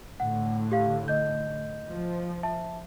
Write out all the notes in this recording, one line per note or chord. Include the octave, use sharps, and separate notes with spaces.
A2 D3 F#5
G4 F5
D#5 G6
F3
E5 A5